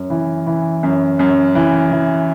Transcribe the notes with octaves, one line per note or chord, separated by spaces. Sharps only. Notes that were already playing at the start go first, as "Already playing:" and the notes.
Already playing: F#2
E3
E3
F#2
F#2
E3
E3